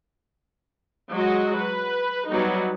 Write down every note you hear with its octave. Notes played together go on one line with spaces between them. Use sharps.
F#3 G#3 F#4 D#5
B4
F#3 G3 B3 D#4